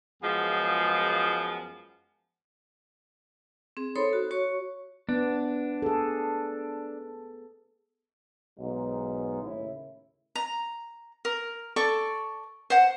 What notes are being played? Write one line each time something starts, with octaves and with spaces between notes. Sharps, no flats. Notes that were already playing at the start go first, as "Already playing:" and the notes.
F#2 F3 G#3 B3 F4 G#4
C4 G#4
D#4 A4 C5 C#5 B5 C6
F#4
F#4 C#5 C#6
B3 D4
G#4 A4
B1 G#2
D#2 A2 C#3 E4 C#5 E5
A#5
A#4
A4 D5 C#6
C5 F#5